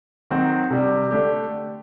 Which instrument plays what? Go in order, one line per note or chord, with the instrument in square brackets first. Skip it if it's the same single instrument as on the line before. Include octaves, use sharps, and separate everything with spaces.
[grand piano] D#3 F#3 C4 F#4
C3 G3 D4
D3 A3 D4 G4